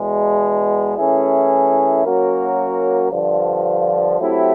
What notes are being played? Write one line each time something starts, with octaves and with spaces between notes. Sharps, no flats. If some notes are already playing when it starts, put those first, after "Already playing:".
Already playing: E2 B2 G#3
E3 A3 C#4 E4 G#4
F#3 A#3 C#4 F#4 A#4
G2 D3 F3
F#3 A3 C4 E4 G4